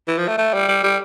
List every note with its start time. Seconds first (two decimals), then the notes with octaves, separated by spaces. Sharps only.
0.07 E3
0.18 F3
0.28 A3
0.38 A3
0.53 G3
0.68 G3
0.83 G3